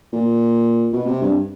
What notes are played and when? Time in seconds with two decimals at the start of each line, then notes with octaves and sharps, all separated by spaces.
0.13 A#2
0.93 B2
1.06 C3
1.22 G2